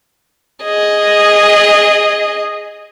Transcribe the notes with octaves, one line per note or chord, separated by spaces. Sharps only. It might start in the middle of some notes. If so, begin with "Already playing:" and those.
G#4 D#5